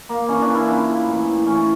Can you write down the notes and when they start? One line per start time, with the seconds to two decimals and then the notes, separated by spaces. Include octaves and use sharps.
0.09 A#3
0.28 C#3 E3 C#4
0.42 D4
0.55 E4
0.68 C#3 F3 E4
1.07 A2 E3
1.46 A2 E3 C#4